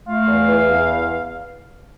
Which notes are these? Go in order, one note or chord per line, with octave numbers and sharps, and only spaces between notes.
A3 F5
E2
E3
E2